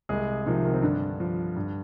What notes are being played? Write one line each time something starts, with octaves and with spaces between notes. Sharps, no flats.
C2 G#3 G#4
C3 D#3 F3 D#4
D#3 D#4
C4
G2 D3 D4
F3
G2